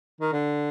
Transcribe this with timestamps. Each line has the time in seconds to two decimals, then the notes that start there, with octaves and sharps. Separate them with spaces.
0.21 D#3
0.33 D3